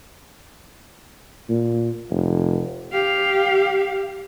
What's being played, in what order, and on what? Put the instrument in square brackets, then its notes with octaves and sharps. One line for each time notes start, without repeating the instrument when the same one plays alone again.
[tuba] A#2
F1
[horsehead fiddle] G4 F5